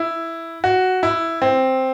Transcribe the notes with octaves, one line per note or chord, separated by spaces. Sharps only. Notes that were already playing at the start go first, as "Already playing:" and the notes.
Already playing: E4
F#4
E4
C4